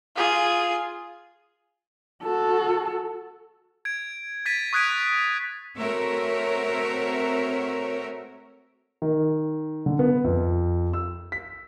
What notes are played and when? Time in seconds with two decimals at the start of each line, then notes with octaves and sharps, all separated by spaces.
0.16 F4 G#4
2.24 F#4 A4
3.85 G#6 D7
4.46 G#6 A6 B6 D#7
4.73 C#6 D#6 F#6 G#6 B6 D7
5.77 A3 C4 F#4 A#4 C#5 E5
9.02 D#3
9.86 D3
9.99 B3
10.24 F2
10.93 E6
11.32 B6